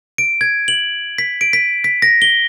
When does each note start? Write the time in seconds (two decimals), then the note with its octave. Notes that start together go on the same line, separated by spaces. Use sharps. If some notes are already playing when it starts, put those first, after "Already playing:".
0.18 D7
0.41 G#6
0.68 F#7
1.18 B6
1.41 D7
1.53 B6
1.84 B6
2.02 A#6
2.22 G7